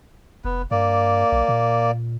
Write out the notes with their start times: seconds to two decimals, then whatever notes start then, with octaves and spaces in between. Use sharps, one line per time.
0.45 F1 B3
0.71 G2 A#3 D5
1.32 B1
1.49 A#2